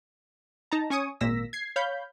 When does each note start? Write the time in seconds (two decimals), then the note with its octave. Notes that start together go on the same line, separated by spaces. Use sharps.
0.72 D#4 A5 A#5
0.90 C#4 G#5 C#6 D#6
1.21 G#1 A#2 A#3 E6 A#6 B6
1.53 G#6 C7
1.76 C#5 F5 B5 G6